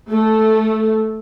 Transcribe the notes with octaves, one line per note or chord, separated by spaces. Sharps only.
A3